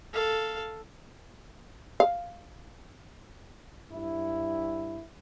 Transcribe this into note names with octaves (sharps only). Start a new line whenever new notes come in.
A4 F5
F5
G2 E4